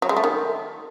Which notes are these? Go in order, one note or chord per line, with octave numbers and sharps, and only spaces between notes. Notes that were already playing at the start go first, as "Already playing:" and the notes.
F#3
G#3
A3
D#3